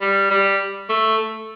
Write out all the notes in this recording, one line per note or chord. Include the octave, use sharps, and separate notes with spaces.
G3
G3
A3